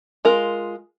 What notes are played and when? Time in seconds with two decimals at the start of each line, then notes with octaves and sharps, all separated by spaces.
0.25 G#3 F4 A#4